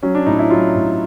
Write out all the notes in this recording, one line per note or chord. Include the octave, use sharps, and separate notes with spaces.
F#3 C#4
D4
A2 D#4
E4
F#3 F4
A2